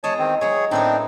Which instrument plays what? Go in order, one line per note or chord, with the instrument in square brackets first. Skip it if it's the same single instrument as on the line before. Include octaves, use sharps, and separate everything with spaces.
[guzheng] E2 G#3 D#5 [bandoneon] C#5 A5
[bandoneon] D#3 C4
[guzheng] F#3 G#3 [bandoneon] G#4 C#5
[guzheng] A2 B3 A#4 [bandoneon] C4 D4 D#4